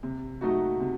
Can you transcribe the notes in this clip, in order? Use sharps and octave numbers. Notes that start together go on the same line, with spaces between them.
C3
F#3 A3 D#4 F#4
C3